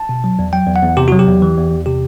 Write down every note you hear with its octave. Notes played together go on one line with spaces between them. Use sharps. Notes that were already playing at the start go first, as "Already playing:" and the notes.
Already playing: A5
B2
F#3
E2
F#3 G5
E2
F#5
E2
C3 G4
F#3 F#4
G4
E2
E3
E2
E2
C3 G4